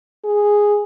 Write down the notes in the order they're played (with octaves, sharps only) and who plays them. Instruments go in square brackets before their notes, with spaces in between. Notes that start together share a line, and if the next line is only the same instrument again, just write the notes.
[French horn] G#4